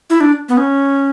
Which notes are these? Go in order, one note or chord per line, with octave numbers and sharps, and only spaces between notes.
E4
D4
B3
C#4